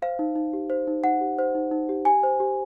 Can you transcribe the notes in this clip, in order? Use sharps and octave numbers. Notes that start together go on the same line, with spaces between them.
C5 F5
D#4
D#4
G4
C5
D#4
D#4 F#5
G4
C5
D#4
D#4
G4
G4 G#5
C5
G4